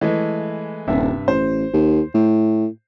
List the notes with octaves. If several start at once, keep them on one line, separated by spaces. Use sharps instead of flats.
E3 G#3 A3
D#1 G2 C3 E5
A1 C5
D#2
A2